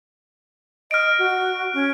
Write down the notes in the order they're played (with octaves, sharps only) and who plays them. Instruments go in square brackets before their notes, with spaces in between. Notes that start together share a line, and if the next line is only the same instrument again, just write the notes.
[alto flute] D#5 [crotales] F6 D7
[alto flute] F#4
C#4